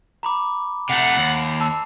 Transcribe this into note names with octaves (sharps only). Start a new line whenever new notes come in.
A#5 B5 D6
C3 A3 F#5 C7 F7
D#2
A5 E6